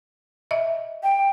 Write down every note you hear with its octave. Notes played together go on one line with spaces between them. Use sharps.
D#5 E5
G5